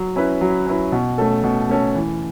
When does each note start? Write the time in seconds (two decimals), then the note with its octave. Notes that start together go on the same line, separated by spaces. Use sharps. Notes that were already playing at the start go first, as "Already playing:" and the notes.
Already playing: F#3
0.16 C#4 E4 B4
0.41 F#3
0.67 C#4 E4 B4
0.92 B2
1.18 A3 C#4 A4
1.44 B2
1.69 A3 C#4 A4
1.95 E3